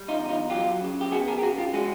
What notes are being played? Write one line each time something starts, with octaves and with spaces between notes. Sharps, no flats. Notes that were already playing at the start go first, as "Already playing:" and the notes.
Already playing: G3
D#4 F4
E2
D#4 F4
F#3 F4 G4
C#3
G4
B3 F#4 G#4
G#4 A#4
G4
C#3 F#4 G#4
F4 G4
G#3 F#4 G#4